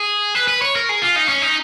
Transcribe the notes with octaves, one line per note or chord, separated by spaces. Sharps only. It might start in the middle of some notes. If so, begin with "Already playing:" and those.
Already playing: G#4
B4
B4
C#5
A#4
G#4
F4
D#4
C#4
D#4